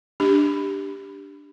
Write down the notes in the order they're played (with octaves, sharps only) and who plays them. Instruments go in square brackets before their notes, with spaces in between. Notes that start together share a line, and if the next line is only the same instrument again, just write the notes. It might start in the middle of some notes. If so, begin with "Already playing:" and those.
[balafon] D4 G4